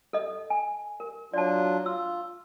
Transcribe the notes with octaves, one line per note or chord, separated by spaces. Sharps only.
A4 D#5
G#5
A#4
F#3 D4 F4 D5 A5
F4 E6